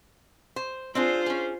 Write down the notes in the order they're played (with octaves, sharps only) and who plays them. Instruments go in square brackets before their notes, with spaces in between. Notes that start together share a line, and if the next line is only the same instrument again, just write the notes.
[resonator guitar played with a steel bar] C5
[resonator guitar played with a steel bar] C4 D4 G#4 [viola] F4 C5
[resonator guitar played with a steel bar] C#4 G#4